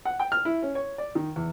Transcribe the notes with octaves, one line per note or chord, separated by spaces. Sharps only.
F#5
G5
F6
E4
C#4
C#5
D5
D#3
E2